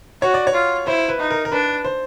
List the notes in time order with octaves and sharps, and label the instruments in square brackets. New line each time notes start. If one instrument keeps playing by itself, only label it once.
[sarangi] F#4 [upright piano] C#5
[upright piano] D5
C#5
[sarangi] F4
[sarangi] E4 [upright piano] C5
[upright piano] B4
[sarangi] D#4
[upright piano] A#4
A#4
[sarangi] D4 [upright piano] B4
[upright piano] C5